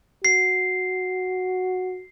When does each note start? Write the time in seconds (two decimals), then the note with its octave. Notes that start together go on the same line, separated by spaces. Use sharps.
0.25 F#4 C7